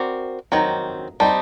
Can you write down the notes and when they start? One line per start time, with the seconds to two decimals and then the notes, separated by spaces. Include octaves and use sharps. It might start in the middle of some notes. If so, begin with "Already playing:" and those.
Already playing: C4 F#4 A#4 D5
0.52 D#3 F#3 C4 A#5
1.20 G3 C4 D#4 A5